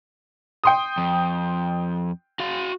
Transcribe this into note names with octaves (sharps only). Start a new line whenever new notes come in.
G5 C6 D#6
F2
F#4 F5